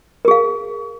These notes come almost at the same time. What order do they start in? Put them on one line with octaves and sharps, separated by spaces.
A#4 G#4 F5